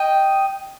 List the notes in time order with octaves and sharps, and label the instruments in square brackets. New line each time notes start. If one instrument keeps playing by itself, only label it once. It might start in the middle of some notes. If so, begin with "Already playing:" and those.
Already playing: [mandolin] D#5 G5